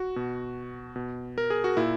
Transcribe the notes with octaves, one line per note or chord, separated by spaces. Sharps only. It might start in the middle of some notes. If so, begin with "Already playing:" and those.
Already playing: F#4
B2
B2
A#4
G#4
F#4
A#2 E4